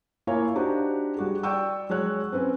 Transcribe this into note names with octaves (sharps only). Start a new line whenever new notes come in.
A#3 E4 F4 C#5 G#5
D4 D#4 F#4 G4 C5
G3 F#4 G#4
D5 G5 C#6 E6
F#3 G#3 C#5 F#6
C4 C#4 B4 G#5